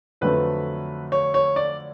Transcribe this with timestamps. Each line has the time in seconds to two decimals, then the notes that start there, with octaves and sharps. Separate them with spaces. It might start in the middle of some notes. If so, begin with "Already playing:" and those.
0.21 F2 D3 F#3 A3 B4
1.12 C#5
1.34 C#5
1.56 D5